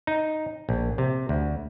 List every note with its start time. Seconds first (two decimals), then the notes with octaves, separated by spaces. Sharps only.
0.07 D#4
0.69 A#1
0.98 C3
1.29 D2